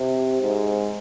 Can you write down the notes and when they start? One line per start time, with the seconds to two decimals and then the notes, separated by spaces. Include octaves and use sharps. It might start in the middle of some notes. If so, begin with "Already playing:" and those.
Already playing: C3
0.42 G#2